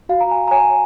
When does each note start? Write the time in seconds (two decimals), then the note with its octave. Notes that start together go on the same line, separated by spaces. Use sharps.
0.09 F#4 F5
0.20 A#5
0.31 G#5
0.48 A#5
0.51 C#5 G#5